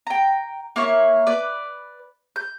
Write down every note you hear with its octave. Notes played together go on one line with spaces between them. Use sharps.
G5 A#5
A#3 E4 C#5
B4 D5
G6